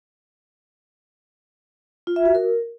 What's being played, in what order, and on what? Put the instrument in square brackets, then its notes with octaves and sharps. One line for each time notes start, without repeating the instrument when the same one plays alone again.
[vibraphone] F4
E5
F#4
A#4